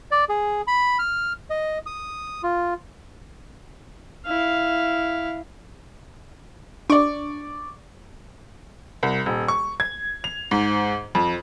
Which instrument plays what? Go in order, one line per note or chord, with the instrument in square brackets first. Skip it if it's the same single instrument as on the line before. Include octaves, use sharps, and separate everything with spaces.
[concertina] D5
G#4
B5
F6
D#5
D#6
F4
[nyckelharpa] E4 F5
[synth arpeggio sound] D4 [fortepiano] D5 C#6
[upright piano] C2
D#1
C#6
G#6
F7
G#2
F2